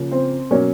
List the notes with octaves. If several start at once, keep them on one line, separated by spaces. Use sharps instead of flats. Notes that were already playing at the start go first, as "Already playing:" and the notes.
Already playing: C#3 F3 A#3
C4 C5
B2 F#3 A#3 C#4 C#5